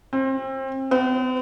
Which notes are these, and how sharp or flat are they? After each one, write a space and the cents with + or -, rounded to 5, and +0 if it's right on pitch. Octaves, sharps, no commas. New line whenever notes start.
C4 +30
C4 -45